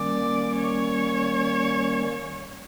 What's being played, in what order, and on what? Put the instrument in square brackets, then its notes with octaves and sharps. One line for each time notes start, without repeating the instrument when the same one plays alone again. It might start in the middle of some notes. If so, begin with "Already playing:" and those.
Already playing: [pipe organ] D#3 G3 A#3 C#4 [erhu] D5
[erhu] C#5